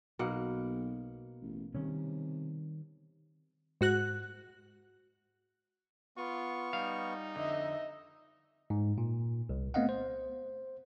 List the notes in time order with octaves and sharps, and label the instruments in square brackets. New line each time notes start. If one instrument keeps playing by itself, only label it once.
[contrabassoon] B1 [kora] B2 A#3 F#5
[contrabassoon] A1
[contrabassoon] C3 [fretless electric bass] D#3 G3 C#4
[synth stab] G#2 F#4 F#6
[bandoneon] B3 C#6 [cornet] F4
[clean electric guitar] G3 F5 [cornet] D#4
[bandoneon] F2 [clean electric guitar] D3 [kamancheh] D#5 E5
[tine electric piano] G#2
A#2
C2
A3 B3 C4 D#5 F5 F#5
C5